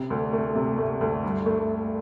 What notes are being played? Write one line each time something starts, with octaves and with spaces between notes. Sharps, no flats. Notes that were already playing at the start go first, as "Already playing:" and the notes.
Already playing: C3
D2
A3
C3
A3
D2
G2
A3